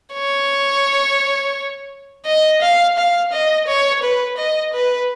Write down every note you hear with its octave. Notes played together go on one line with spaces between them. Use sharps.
C#5
D#5
F5
F5
D#5
C#5
B4
D#5
B4